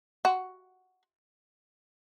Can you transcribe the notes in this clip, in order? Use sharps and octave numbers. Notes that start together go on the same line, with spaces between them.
F#4